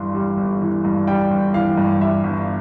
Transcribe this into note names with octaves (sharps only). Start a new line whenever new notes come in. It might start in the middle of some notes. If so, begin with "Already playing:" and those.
Already playing: G1 G2 E3 C6
G3
G1
E3
G2
G3 G5
G1
E3 F5
G2
G3 E5
G1